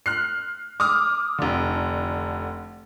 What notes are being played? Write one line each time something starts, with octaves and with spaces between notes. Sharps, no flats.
F6 F#6 C7
D6 D#6 F6
F1 D3